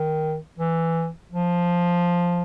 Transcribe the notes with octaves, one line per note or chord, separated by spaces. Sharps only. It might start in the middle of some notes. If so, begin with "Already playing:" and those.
Already playing: D#3
E3
F3